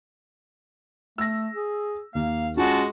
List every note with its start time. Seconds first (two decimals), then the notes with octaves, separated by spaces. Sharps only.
1.18 A3 E6 A#6
1.54 G#4
2.15 D#2 A#3 F5
2.57 G#3 C#4 F4 F#4 F#5 A5